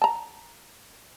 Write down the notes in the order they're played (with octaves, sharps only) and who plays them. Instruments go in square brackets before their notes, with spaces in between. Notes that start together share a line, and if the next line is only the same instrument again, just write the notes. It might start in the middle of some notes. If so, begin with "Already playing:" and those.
[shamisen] A5 A#5